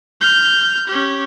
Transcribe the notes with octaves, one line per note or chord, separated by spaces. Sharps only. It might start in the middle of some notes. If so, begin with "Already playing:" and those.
F6 G6
C#4 G4